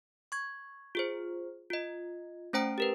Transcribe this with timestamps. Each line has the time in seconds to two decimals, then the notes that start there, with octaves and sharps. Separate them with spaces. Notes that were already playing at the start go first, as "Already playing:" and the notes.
0.32 C#6 G#6
0.95 F4 G#4 C5
1.70 F4 D#5
2.53 A3 C#4 C5 G5 A#5 D7
2.78 G4 A#4 B4